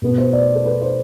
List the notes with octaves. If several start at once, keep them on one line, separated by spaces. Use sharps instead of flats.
B2 B3
C5
D5
A4
B4
C5